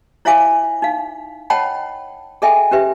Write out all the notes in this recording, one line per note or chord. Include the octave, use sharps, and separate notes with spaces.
E4 C#5 E5 F5 G#5 D6
D#4 F5
C#5 D#5 F#5 G5 A5 B5
G#4 A4 D#5 E5 G5 G#5
C#4 G4 B4 E5